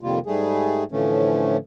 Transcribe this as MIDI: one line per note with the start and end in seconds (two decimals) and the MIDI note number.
0.01 0.19 41
0.01 0.19 48
0.01 0.19 51
0.01 0.19 55
0.01 0.19 58
0.01 0.19 65
0.26 0.84 44
0.26 0.84 55
0.26 0.84 57
0.26 0.84 68
0.92 1.57 45
0.92 1.57 50
0.92 1.57 52
0.92 1.57 53
0.92 1.57 57
0.92 1.57 61